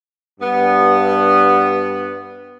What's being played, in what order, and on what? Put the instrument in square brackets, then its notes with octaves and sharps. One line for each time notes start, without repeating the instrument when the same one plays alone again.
[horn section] G2 B3